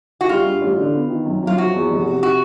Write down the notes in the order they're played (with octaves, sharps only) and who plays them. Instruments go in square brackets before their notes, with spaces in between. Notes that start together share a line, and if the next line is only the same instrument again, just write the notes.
[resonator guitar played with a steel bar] F#4
[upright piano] G3 [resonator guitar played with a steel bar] F4
[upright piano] G2
A1
D3
B3
D#3
F#2
[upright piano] F#3 [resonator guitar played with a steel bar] F4
[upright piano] F3 [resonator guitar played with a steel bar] F#4
[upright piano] E2
F1
C3
[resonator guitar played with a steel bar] F#4